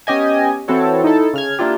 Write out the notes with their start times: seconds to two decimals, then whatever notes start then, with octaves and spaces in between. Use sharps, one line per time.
0.07 B3 C#4 G4 D#5 G#5
0.68 E3 C4 E4 F#4 A4 C#5
1.04 D#4 E4 A4
1.33 C#3 F6 G#6
1.59 A#3 D4 E4 F4 G4